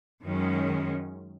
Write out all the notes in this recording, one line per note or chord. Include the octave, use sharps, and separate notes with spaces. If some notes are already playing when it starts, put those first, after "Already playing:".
F#2 D#3 G#3 C#4